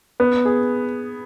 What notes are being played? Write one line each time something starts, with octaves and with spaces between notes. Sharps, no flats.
B3
G#4